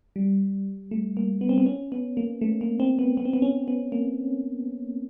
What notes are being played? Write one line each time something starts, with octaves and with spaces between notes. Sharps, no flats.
G3
A3
A#3
B3
C4
B3
C#4
B3
A#3
A3
A#3
C4
B3
B3
C4
B3
C#4
B3
A#3